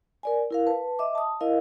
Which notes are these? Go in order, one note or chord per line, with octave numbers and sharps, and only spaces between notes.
A#4 D5 G#5
E4 A#4 F5
B4 A5
D#5 E5 D6
A5 D#6
E4 A#4 D#5 F5